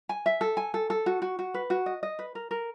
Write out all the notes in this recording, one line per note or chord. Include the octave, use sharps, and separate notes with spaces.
G#5
E5
A4
G#5
A4
A4
F#4
F#4
F#4
B4
F#4
D#5
D#5
B4
A#4
A#4